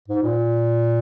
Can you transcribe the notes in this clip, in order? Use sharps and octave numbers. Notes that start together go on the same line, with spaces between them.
G#2
A#2